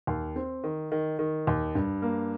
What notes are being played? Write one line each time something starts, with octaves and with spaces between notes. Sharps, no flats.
D#2
C4
D#3
D#3
D#3
D#2
G2
A#3